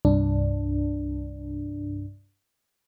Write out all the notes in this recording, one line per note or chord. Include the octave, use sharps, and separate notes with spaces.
C2 G2 D4